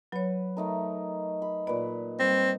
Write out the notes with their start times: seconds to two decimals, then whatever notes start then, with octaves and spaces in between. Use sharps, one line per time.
0.12 F#3 B4 C#5
0.57 A3 D#4 A#4
1.42 B5
1.67 A#2 B4 D5
2.20 G3 C4